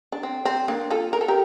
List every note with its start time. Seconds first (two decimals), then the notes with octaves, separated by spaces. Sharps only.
0.12 D4
0.23 C4
0.45 C4
0.68 A#3 D4
0.90 F4 A4
1.13 A#4
1.21 A4
1.28 G4 A#4